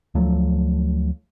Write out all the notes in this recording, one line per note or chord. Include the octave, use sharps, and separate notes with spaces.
D2 F3 F#3 A3